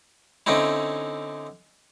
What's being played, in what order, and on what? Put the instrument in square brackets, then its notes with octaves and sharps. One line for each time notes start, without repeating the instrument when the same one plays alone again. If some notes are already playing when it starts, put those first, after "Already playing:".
[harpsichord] D3 C4 C#4 D#4 E4